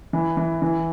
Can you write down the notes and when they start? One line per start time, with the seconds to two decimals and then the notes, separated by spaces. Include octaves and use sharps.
0.13 E3
0.37 E3
0.62 E3